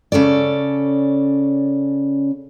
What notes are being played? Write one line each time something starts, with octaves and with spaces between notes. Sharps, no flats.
C#3 C#4 A4 D5